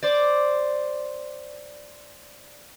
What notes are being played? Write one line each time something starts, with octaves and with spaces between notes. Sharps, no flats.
C5 D5